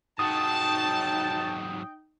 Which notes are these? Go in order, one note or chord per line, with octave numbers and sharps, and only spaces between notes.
G#2 F#3 D#4 G5 A5 D#6